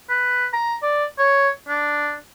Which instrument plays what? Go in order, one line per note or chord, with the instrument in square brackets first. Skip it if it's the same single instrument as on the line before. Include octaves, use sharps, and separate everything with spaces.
[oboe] B4
A#5
D5
C#5
D4